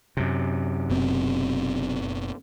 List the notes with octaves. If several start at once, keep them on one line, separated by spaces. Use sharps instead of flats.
F#2 C3
F#1 B2 C4